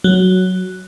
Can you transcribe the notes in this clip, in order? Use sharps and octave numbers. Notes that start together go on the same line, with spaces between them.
F#3